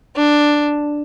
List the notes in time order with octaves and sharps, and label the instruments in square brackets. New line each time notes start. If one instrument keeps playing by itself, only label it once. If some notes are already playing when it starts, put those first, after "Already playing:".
[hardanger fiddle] D4